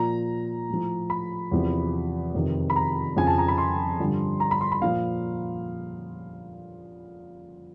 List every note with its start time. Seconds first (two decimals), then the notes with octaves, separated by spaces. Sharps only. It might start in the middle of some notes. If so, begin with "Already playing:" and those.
Already playing: A#2 F3 A#5
0.69 A2 F3
1.10 B5
1.51 E2 C3 F3
2.35 F2 C3 D#3
2.70 B5
2.76 A#5
3.17 F2 C#3 F3 G#5
3.27 A5
3.38 A#5
3.48 B5
3.58 C6
4.00 G2 D3 F3
4.40 A#5
4.51 B5
4.61 C6
4.72 B5
4.82 A#2 F3 F5